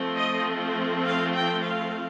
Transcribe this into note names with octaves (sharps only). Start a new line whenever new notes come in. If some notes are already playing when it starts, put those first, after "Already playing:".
Already playing: F3 A3 C4
D#5
F5
G5
F5